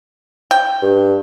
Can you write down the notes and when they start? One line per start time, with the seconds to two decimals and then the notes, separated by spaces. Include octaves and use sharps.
0.51 G5
0.82 G2